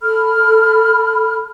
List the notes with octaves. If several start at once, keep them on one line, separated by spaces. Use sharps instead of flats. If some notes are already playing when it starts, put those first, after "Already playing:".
A4 B5 F6